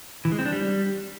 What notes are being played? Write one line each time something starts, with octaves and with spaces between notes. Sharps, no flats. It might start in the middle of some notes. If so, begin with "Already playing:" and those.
E3
G#3
C4
D4
G3